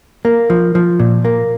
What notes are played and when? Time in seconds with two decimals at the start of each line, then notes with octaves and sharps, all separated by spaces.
0.25 A#3
0.50 F3
0.75 F3
0.99 A#2
1.25 A#3